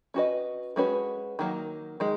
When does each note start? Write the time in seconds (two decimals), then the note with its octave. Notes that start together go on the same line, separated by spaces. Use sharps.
0.14 C#4 F#4 B4 D#5
0.76 G#3 C#4 F#4 B4
1.39 D#3 F#3 A#3
2.00 D#3 G#3